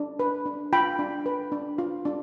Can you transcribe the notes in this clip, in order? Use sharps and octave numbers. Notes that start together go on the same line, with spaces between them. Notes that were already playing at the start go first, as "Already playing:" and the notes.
Already playing: D4
B4
D4
F4 G5 B5
D4
B4
D4
F4
D4